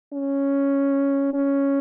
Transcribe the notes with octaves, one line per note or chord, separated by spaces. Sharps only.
C#4
C#4